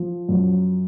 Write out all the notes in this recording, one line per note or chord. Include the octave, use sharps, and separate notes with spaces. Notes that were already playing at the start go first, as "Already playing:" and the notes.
Already playing: F3
F#2